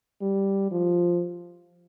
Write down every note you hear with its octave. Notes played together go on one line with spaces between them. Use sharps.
G3
F3